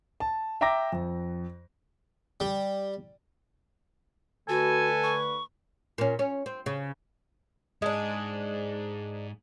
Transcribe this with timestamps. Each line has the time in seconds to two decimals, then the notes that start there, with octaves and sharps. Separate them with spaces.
0.20 A5
0.61 E5 G5 A#5 D6 A#6
0.92 F2
2.40 G3
4.49 D3 A3 F#4 A4 B4 G#5
5.03 C#6
5.98 A#2 C#4
6.19 C#4
6.46 C4
6.66 C#3
7.82 G#2 G#3 D4